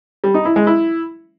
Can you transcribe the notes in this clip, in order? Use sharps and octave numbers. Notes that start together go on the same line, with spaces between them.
G3
D#4
E4
G#3
E4